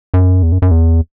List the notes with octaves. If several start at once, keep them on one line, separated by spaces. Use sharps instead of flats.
F#2
E2
F#2
F#2
E2